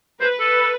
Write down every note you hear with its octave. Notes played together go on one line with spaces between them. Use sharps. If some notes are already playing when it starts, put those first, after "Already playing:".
B4 C5
A4